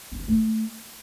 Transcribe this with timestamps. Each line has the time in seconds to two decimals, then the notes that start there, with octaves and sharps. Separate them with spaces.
0.12 C4
0.20 C#4
0.28 A3